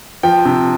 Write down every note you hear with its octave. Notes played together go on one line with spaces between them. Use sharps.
F3 G5
C3